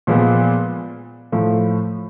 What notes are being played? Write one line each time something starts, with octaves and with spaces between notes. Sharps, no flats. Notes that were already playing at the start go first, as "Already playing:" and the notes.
A#2 F3 G#3 B3
A2 F3 A3